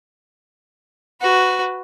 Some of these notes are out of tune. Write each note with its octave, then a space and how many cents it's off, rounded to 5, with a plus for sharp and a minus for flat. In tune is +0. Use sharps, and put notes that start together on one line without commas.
F#4 +0 B4 +15